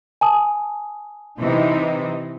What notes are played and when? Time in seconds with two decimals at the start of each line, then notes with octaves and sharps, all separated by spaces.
0.21 G#5 A5 D#6
1.40 C3 E3 D#4